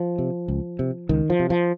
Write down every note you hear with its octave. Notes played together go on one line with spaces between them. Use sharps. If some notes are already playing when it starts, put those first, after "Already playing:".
Already playing: F3
C3
C#2
C3
C#2 D#3
F3
C3
F3